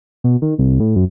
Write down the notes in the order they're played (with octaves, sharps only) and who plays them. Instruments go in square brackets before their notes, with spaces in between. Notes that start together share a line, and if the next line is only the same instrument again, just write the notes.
[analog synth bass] B2
D#3
C2
A2
F#2